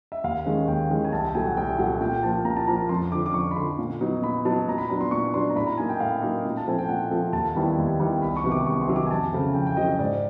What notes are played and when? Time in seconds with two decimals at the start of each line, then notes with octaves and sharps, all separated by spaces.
0.12 E5
0.24 D#2 F5
0.45 D#3 G#3 C#4
0.67 D#2 G5
0.90 D#3 G#3 C#4
1.05 G#5
1.12 C2 A5
1.27 G5
1.35 A#2 F#3 A3 G#5
1.46 F#5
1.57 C2 G5
1.78 A#2 F#3 A3 F#5
2.01 A#2 G5
2.23 F3 A#3 A5
2.45 A#2 A#5
2.57 A5
2.68 F3 A#3 A#5
2.89 F2 C6
3.11 D3 D6
3.15 F3
3.26 D6
3.34 F2 C#6
3.51 B5
3.56 D3 F3 C6
3.79 A#2
4.01 F#3 B3 D#4
4.22 A#2 B5
4.45 F#3 B3 D#4 A5
4.67 A#2 A#5
4.78 B5
4.90 F#3 B3 D4 A#5
5.01 C6
5.11 A#2 C#6
5.34 F#3 B3 D4 C6
5.50 A#5
5.55 A2 B5
5.67 A#5
5.78 F#3 A#3 D#4 G#5
5.89 G5
6.00 A2 F5
6.22 F#3 A#3 D#4
6.45 A#2
6.57 A5
6.67 F3 A3 C4 G#5
6.78 G5
6.88 A#2 F#5
7.11 F3 A3 C4
7.33 D#2 A5
7.55 D#3 G3 B3 E4
7.78 D#2
7.99 D#3 G3 B3 E4
8.22 C2 B5
8.37 C#6
8.44 C3 D#3 F#3 B3
8.52 D6
8.66 C2 C#6
8.81 C6
8.88 C3 D#3 F#3 B3
8.96 D6
9.06 G#5
9.11 F2 A5
9.33 C#3 F#3 A3 C4
9.54 F2 G5
9.67 G5
9.77 C#3 F#3 A3 C4 D#5
9.88 D#5
9.99 G#2 D5